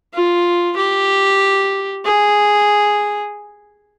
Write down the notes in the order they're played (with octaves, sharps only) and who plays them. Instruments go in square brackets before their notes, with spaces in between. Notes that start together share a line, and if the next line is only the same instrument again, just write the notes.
[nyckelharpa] F4
G4
G#4